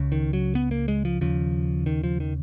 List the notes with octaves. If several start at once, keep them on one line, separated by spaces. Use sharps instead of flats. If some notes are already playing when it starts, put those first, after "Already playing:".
Already playing: C#2 C#3
D#3
F#3
B3
A#3
G#3
F3
D#2 C#3 F3
D#3
F3
D#3